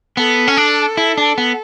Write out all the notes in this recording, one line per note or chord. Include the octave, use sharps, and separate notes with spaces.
B3 A4
C#4
D4
E4
D4
B3